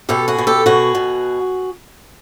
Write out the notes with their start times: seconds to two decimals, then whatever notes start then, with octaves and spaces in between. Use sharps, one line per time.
0.09 B2 G4 A4
0.28 F#4 G#4
0.38 B2
0.47 G4 A4
0.66 B2 F#4 G#4
0.95 B2